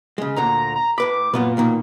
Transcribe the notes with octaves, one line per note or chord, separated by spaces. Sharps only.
C#3 G#3
D2 A#2 D3 A#5
A#5
A2 B4 B5 D6
F#2 A#2 B3 B4
B2 D#3 A#3